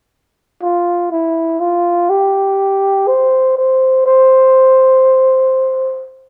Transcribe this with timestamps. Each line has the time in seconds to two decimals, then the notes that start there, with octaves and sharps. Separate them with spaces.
0.63 F4
1.12 E4
1.60 F4
2.10 G4
3.08 C5
3.57 C5
4.06 C5